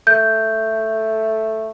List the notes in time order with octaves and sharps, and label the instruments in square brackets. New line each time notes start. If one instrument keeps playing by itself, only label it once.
[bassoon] A3 [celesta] G6